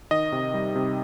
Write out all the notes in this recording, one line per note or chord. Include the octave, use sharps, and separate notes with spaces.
D#3 D#5
C3
G3
C3